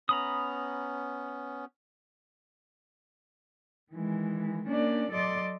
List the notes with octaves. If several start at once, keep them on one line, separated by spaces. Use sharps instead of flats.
B3 C#4 A#5 B5 D#6
D#3 E3 G#3
A#3 C#4 D4 D5
F#3 A4 D5 D#5 C6 D6